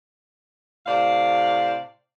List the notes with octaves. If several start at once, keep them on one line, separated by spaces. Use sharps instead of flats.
A2 C3 C5 D5 F5